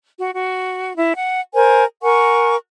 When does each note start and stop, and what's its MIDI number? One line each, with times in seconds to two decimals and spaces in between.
0.17 0.31 66
0.34 0.95 66
0.96 1.13 64
1.15 1.40 78
1.54 1.84 70
1.54 1.84 72
1.54 1.84 80
2.02 2.56 70
2.02 2.56 78
2.02 2.56 80
2.02 2.56 85